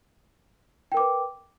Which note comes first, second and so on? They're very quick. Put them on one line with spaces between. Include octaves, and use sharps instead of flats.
G5 A#4 D6 B4